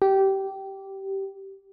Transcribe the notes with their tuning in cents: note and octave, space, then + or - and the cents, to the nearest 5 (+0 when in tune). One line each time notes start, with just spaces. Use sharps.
G4 -15